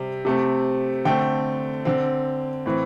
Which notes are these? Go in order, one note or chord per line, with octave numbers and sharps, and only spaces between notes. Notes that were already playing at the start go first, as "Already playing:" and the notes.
Already playing: C3 G3 C4
C3 A3 C4
D3 A3 C4 G5
D3 C4
A2 E3 C4